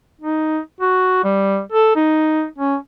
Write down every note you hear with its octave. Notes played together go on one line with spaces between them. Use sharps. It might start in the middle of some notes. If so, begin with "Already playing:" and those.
D#4
F#4
G3
A4
D#4
C#4